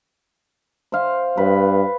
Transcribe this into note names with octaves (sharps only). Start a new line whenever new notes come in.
C5 F5
G2 B4